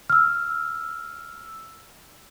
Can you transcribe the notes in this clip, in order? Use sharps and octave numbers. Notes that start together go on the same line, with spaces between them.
E6 F6